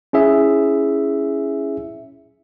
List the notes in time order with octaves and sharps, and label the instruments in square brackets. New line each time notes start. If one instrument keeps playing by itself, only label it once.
[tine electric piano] C#4 E4 G#4 E5